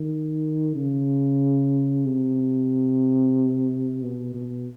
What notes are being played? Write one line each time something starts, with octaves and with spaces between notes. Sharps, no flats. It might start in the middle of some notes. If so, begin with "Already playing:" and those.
Already playing: D#3
C#3
C3
B2
B2